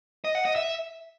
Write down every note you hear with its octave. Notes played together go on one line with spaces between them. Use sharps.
D#5
F#5
D#5
E5